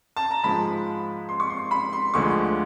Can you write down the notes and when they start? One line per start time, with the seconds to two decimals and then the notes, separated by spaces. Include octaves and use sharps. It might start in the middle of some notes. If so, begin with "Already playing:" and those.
0.16 A5
0.31 A#5
0.44 G#2 F3 G#3 B5
1.29 C6
1.40 C#6
1.50 C6
1.71 B5
1.93 C6
2.14 D2 D3 F3 G#3 C#6